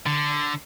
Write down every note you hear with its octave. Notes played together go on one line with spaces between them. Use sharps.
D3